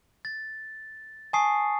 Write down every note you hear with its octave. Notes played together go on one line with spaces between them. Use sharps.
A6
G#5 A5 C#6 D#6 C7